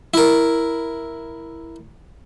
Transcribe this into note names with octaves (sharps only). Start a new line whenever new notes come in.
E4 A#4